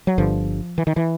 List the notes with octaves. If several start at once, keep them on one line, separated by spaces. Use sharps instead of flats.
F#3
G1 G2 D3 F3
E3
D#3
E3